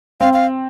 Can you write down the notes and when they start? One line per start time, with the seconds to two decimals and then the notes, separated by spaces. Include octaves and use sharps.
0.21 C4 F5
0.34 F5